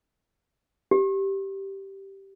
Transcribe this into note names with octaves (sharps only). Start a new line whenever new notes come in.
G4